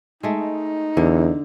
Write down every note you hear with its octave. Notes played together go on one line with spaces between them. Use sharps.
G#3 A3 D#4
E2 D3